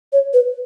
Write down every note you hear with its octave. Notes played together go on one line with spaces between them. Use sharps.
C#5
B4